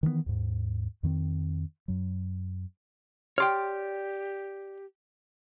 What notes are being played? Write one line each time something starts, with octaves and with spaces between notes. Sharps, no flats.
D#3 E3 G3 B3
D#2 G#2
F2 D#3 C4
F#2 F#3
G4 C#5 D5 G5 C6 F6